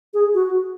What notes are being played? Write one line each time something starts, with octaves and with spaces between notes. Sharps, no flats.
G#4
F#4